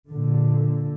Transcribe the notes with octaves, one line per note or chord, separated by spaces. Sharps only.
A#2 D3